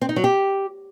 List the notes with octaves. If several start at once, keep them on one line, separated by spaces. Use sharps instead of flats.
C4
D#4
F#3
G4